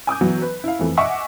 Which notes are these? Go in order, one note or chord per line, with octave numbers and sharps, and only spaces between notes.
G#5 D6 D#6 G6
E3 F#3 B3
B4
E4 F5
F2 E3 A3
D#5 E5 F#5 G#5 C#6 D6